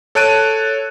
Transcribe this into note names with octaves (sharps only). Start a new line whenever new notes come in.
A4 C#5 A5 F#6 D7 D#7